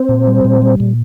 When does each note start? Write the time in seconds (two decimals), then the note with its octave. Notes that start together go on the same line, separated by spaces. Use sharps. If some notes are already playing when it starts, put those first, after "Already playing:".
Already playing: C4 C5
0.09 A#2
0.27 G3
0.45 A#2
0.62 G3
0.80 A#2